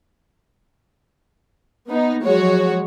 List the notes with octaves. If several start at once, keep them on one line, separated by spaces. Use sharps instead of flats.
B3 D#4
F3 F#3 G#3 F#4 C#5